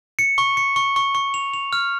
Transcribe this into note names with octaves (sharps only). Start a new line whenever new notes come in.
C#7
C#6
C#7
C#6
C#6
C#6
F7
F7
F6